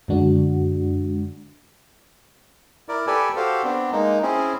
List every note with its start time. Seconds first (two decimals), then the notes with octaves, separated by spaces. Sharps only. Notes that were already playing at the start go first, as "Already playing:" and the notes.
0.08 F#2 D3 G#3 D4 F#4
2.89 E4 A#4 D5
3.07 G4 A4 B4 D5 G#5
3.36 F#4 G4 A4 C5 F5
3.64 B3 C4 D4
3.92 G#3 A#3 D#4
4.23 C4 C#4 E4 G#4